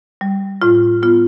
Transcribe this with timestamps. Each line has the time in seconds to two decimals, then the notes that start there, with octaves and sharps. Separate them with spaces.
0.21 G3
0.62 A2 F4
1.03 B3 F4